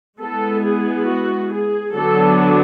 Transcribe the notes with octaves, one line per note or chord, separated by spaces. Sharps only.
G#3 B3 E4 A4
G#4
F#4
G#4
D3 F#3 B3 D4 A4